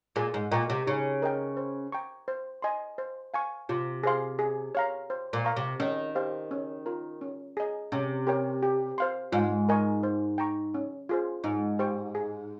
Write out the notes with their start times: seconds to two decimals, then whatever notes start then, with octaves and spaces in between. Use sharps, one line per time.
0.16 A#2 G#4
0.34 G#2
0.52 A#2 D#5 G5 A#5 C#6
0.70 C3
0.87 C#3 D#4
1.22 A#4 D#5 G5
1.57 C5
1.92 G5 A#5 C#6
2.28 C5
2.62 D#5 G#5 C6
2.98 C5
3.34 F5 G#5 C#6
3.69 C3 F4
4.03 G#4 C5 F5 C6
4.39 G#4
4.75 C#5 F5 A#5
5.10 C5
5.33 A#2
5.45 F5 A#5 C#6
5.56 C3
5.80 D#3 C#4
6.15 G4 C5 F5
6.51 C#4
6.86 F4 A#4
7.21 C#4
7.57 G#4 D#5
7.92 C3 C#4
8.27 G4 A#4 C#5 G5
8.63 G4
8.98 C5 F5 C6
9.32 G#2 F4
9.69 A#4 D#5 G#5 C#6
10.03 C5
10.38 G5 A#5 C#6
10.74 C#4
11.09 F4 G#4 C5
11.44 G#2 D#4
11.79 G4 C5 G5 C#6
12.15 G#4